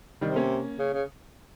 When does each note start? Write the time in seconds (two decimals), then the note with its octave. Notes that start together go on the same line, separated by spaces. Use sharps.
0.21 C3 D#3 G3
0.36 A#3 C#4
0.79 C#3
0.93 C#3